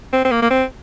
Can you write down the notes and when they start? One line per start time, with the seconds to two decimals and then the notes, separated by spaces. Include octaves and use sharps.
0.13 C4
0.25 C4
0.32 A#3
0.42 A#3
0.50 C4